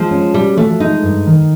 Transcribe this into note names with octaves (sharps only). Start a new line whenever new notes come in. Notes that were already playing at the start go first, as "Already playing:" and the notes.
Already playing: F3 G#3
C#4
G3 F#4
F3 A3
G#3 D#4
G2
D#3